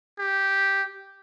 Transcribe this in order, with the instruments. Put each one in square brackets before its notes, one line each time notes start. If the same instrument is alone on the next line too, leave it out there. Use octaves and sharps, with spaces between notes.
[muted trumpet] G4